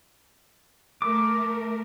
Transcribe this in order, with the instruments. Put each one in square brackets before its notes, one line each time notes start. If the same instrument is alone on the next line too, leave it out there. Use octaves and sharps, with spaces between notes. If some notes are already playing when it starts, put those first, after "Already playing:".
[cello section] A3 A#4 [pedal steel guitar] D6